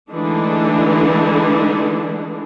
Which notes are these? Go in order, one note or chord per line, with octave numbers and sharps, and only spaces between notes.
D3 E3 G#3 A3 D4 D#4